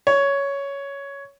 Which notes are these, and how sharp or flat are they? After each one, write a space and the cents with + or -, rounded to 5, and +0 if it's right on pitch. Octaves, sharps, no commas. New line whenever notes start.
C#5 +10